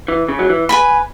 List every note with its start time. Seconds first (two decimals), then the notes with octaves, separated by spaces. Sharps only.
0.08 E3
0.29 C#3
0.39 F#3
0.49 E3
0.69 B4 G#5 B5